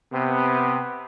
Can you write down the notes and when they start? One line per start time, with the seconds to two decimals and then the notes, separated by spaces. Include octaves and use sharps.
0.11 C3 B3